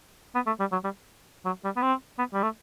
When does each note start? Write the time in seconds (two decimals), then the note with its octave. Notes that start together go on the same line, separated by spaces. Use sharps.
0.35 B3
0.47 A3
0.60 G3
0.72 F#3
0.84 G3
1.45 F#3
1.64 G3
1.76 B3
1.82 C4
2.19 B3
2.33 G3
2.43 A3